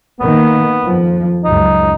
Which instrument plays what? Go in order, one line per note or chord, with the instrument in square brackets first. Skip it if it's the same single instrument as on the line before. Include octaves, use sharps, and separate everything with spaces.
[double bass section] D#3 A#3 [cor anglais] B3
[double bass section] F2 F3
[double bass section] C#2 F#2 [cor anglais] D#4